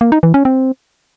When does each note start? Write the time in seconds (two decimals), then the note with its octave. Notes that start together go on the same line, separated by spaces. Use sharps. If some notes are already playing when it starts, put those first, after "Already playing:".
0.01 A#3
0.12 D#4
0.23 E3
0.34 C#4
0.45 C4